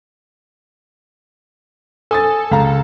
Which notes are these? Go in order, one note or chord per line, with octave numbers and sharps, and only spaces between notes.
A4 G#5 D#6 A6
C#2 F5 A#5